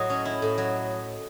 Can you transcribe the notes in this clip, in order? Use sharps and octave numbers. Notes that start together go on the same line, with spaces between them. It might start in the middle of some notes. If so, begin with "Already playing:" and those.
Already playing: A2 F#3 D#5
C#4
E4
A2
F#3